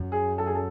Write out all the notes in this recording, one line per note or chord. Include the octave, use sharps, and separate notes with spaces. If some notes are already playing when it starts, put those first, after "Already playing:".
Already playing: F#2
G#4
A4
G#4
A4